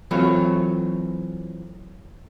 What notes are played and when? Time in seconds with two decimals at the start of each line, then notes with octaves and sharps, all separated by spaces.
0.11 E3 F#3 A3 C4 F4 C#5